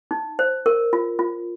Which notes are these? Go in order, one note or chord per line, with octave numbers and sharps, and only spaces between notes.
D#4
C5
A#4
F4
F4